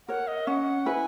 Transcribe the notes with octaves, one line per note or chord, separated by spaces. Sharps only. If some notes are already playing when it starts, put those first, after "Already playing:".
A#4 C#5 F#5
D#5
C#4 F#5
E4 B4 G#5